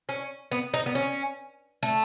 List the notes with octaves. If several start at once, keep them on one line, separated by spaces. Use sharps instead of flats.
C#4
B3
D#4
B3
C#4
A3